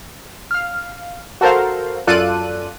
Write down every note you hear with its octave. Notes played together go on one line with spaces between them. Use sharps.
F5 F6
F#4 A4 A#4 C5 F5
F#2 F4 A4 D5 F#6 D#7